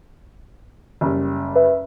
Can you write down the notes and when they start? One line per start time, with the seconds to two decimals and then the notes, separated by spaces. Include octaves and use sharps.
1.01 F#1 G3
1.55 B4 E5